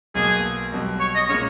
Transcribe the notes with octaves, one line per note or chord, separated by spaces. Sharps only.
B1 B2 A#3 G#4
B1 B2 G3
C#5
D#5
A#2 G#3 C#4 C#5